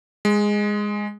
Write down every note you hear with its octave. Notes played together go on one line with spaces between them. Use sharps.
G#3